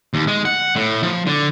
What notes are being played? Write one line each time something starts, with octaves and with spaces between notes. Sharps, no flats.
D#2
G#3
F#5
A2
F3
D3